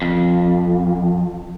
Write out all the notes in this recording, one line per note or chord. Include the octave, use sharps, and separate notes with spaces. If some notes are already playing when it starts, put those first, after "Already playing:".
F2